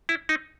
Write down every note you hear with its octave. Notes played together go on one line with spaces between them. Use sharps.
E4
D#4